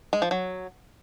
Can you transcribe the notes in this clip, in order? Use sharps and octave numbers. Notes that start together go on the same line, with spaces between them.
G#3
F3
F#3